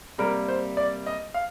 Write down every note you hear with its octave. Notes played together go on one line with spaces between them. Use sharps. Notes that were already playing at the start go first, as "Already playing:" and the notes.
C3 G3 A#3 A#4
C5
D5
D#5
F5